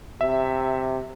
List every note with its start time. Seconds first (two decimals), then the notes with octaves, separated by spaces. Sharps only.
0.21 C3 E5